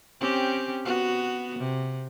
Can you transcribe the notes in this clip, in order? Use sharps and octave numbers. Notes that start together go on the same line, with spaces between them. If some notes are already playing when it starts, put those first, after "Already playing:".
C4 C#4 G4
B3 F#4
C3